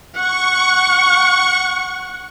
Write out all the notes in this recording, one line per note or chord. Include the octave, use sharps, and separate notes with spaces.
F#5 C#6